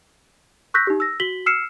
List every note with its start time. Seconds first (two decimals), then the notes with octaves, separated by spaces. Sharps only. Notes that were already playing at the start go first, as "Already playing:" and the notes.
0.74 C#6 E6 F#6 G6 A#6 B6
0.87 D#4 G4
1.00 E6 A#6
1.20 F#4 B6 F#7 G7
1.46 E6 F6 C7 C#7 E7